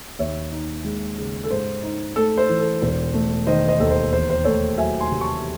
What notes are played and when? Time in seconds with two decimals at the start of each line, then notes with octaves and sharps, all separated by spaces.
0.19 D#2 C#5 E5
0.52 D#4
0.85 G#3
1.18 C#3
1.44 A4
1.50 G#2 C5
1.83 D#4
2.16 A3 A4
2.38 C5
2.49 E3
2.60 A4
2.82 E1 C5
3.14 A3
3.47 D#3 C5 D#5
3.68 C5 D#5
3.80 D#2 A4
3.91 C5
4.12 E2 C5
4.29 C5
4.45 A3 A4 C#5
4.77 F#3 E5 G#5
5.00 G#5 C6
5.11 C3
5.21 A5 C#6